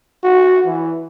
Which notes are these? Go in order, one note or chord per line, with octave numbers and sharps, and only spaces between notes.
F#4
E3